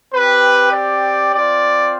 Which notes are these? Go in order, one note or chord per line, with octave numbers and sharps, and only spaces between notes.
C4 G4 B4
D5
C4 F4 D5